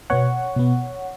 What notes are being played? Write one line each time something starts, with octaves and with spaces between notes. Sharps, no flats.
B2 B3 C#5 F#5
B2 B3